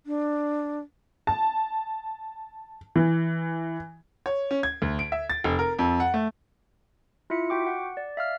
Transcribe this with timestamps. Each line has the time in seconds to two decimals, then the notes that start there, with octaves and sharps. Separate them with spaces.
0.06 D4
1.27 A5
2.96 E3
4.26 C#5
4.51 C#4
4.63 G#6
4.82 D2
4.99 D7
5.12 E5
5.30 A6
5.44 F1
5.59 A#4
5.79 F2
6.00 F#5
6.14 A3
7.30 E4 F4 E5 C#7
7.50 F#4 G5 D6
7.67 F#5
7.97 D5
8.17 E5 F5 F6